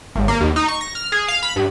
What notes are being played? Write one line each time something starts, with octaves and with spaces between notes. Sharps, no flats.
G#1
A#3
D#2
D#4
C#6
A#6
F6
G#4
F5
B5
G2